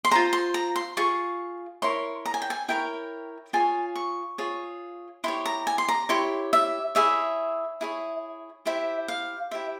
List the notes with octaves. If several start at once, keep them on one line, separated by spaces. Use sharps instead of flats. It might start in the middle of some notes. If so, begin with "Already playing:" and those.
C6
F4 G#4 C5 A#5
C6
A#5
C6
F4 G#4 C#6
E4 A#4 C#5 C6
A#5
G#5
G5
G#5
E4 A#4 C#5 G5
F4 G#4 C#5 G#5
C#6
F4 G#4 C#5
E4 G4 C#5 C6
A#5
G#5
C6
A#5
E4 G4 C#5 C6
E5
E4 G#4 C#5 E5
E4 G#4 C#5
E4 G4 C5 E5
F5
E4 G4 C5 E5